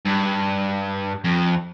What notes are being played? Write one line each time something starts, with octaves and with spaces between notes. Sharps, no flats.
G2
F2